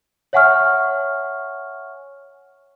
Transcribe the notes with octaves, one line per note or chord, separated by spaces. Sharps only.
C#5 E5 F#5 G#5 C#6 F6